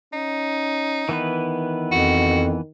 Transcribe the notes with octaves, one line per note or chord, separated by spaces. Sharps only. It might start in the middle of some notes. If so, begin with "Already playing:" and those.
C#4 D#4
D#3 E3 B3 B4
F2 F#4